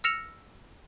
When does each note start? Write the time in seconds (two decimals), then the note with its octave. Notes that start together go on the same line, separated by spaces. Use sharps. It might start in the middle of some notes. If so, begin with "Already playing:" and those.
0.04 E6 F6 A#6 C#7 E7 F7